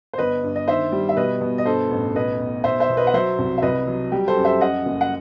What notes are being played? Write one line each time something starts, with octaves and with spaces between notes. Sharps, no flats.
C5
G1 B4 D#5
G2
D#5
D#3 C5 E5
G3
E5
B2 B4 D#5
B2
D#5
G2 A4 C5
A1
B1 B4 D#5
B1
B1 C5 E5
C5 E5
B2
B4 D#5
F#5
F#3 C5 E5
C2
E5
C2 B4 D#5
F#3
G3 G4
A4 C5
F#2
C5 E5
F#2 D#5 F#5
F#1
F#5